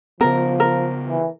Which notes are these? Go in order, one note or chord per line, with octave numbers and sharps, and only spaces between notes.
C#3 F3 B3 A#4
A#4
E3